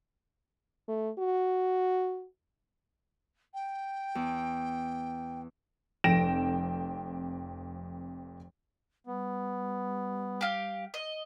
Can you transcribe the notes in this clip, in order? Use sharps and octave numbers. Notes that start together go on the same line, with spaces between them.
A3
F#4
G5
E2
F1 F2 G5 A#6 D7 E7
G3 B3
G4 F5
D#5